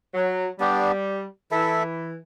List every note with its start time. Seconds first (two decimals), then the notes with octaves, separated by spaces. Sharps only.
0.14 F#3
0.59 G3 B3 D4 G4
1.51 E3 E4 A4 E5